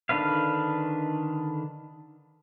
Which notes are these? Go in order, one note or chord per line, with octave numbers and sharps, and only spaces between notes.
D3 D#3 D4 B4 F5